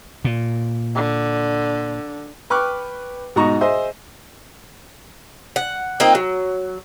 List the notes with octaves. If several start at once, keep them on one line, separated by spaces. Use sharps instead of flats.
A#2
D3
B4 G5 C#6 D6 F6 F#6
G#2 B2 D#4 F#4 A#5 C#6
G#4 C5 D#5 E5
F#5
A#3 C4 D#4 F4
F#3